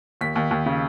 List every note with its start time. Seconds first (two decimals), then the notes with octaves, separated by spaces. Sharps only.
0.21 D#2 B6
0.36 D#2
0.51 D#2
0.66 C#3